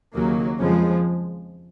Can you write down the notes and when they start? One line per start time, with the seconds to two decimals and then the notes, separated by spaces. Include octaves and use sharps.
0.13 D#2 C#3 F#3 A#3
0.59 F2 C#3 F3 G#3